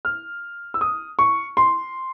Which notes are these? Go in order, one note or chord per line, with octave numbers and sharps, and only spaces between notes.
F6
E6
D#6
C#6
C6